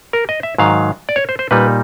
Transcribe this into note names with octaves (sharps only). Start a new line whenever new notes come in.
A#4
D#5
E5
G#2 D#3 F#3 F5
D5
C#5
C5
C5
A#2 G3 A#3 D#4 B4